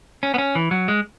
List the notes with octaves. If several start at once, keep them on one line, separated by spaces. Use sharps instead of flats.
C#4
B3
C#4
E3
F#3
G#3